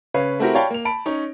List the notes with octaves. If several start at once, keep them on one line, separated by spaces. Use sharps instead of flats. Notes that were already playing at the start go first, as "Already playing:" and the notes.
C#3 B4 C#5 F5 C7
A3 C4 E4 F#4 G4 A#4
C#5 D5 F5 G5 A5 B5
A#3 F7
A5 B5 D7
C#4 D#4 C#5